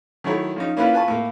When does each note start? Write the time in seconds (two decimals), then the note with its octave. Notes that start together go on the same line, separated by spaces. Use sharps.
0.24 D#3 F#3 A3 E4 C#5
0.56 F3 C#4 D#4
0.77 A#3 C#4 E4 F4 B4
0.93 F4 B4 G#5 A5 C#6
1.08 A2 A#3